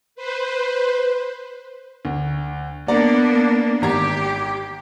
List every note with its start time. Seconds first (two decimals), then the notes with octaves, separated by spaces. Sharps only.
0.15 B4 C5
2.05 D2
2.88 A#3 B3 D4 D5 A#5
3.82 G#1 G4 A#5 G#6